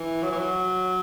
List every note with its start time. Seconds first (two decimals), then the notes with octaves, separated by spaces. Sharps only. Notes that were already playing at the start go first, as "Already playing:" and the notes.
Already playing: E3
0.22 F#3
0.31 E3
0.38 F#3